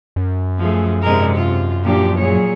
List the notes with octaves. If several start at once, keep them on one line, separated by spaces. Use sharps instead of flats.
F#2
F3 A3 G#4
G#2 C3 G#3 D4 A#4
F4
A#2 F3 F#3 D4 G4
A#2 F#3 G#4 C#5